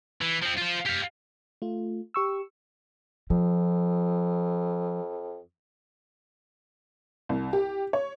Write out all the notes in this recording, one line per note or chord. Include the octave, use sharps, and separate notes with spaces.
E3
F3 C4
F4 C5
G4 F5
A3 F4
G4 C#6 E6
F2 F3
C2
G4
C#5